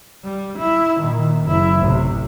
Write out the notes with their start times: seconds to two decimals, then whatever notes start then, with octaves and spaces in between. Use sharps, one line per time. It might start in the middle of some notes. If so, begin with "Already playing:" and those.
0.25 G3
0.59 E4
0.99 A#2 D#3
1.45 F#1 E4
1.78 A1 C3